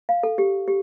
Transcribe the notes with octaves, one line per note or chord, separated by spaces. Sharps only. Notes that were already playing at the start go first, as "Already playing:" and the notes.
F5
A4
G4
G4